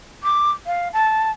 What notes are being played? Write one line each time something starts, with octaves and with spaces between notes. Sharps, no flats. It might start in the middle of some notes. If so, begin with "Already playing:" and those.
D6
F5
A5